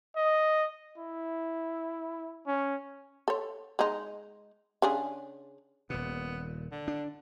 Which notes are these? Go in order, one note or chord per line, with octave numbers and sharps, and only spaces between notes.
D#5
E4
C#4
A4 C#5
G#3 D#4
C#3 D4 G#4
D#1 A#2 B3
D3
D4